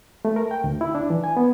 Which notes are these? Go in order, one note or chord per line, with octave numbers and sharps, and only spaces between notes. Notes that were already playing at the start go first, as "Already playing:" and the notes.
A3
A#4
G5
D2
E4
D4
E3
G#5
B3